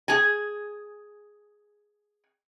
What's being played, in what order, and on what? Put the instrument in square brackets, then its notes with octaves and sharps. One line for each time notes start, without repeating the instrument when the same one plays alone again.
[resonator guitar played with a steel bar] G#4 G#5